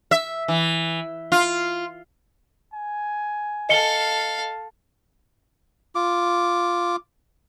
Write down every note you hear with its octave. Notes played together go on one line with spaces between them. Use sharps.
E5
E3
F4
G#5
A4 D#5 F5 C#7 G7
F4 D6